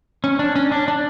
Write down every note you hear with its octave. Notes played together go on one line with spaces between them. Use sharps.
C#4
D4
C#4
D4
D4